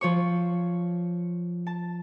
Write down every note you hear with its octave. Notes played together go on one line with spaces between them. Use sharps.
F3 C#5 C#6
A5